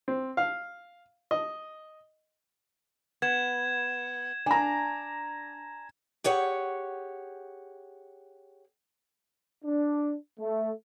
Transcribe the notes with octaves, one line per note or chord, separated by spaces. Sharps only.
C4
F5
D#5
B3 G#6 E7
D4 G#5 A#5
G4 G#4 C#5 F#5
D4
A3